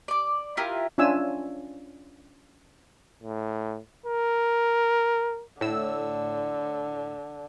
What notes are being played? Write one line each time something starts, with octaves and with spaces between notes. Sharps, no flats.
D5 D6
E4 F4 G4 A#4
C#4 D4 F4 E5 G#5 E6
A2
A#4
A2 D3 E6